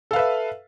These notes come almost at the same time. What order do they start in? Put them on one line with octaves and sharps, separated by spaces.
A4 F5 B4 E5